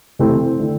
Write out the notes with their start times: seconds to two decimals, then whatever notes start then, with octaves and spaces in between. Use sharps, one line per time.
0.19 C3 E3 A3 C4 E4
0.59 D3 A3 E4